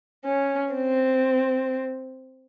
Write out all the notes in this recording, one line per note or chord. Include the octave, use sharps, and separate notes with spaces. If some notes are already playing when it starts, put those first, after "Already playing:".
C#4
C4